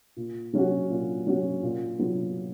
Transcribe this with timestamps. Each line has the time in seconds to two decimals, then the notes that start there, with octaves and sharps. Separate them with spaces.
0.16 A#2
0.53 F#3 C#4 F#4
0.90 A#2
1.27 F#3 C#4 F#4
1.63 A#2
1.99 F#3 B3 F4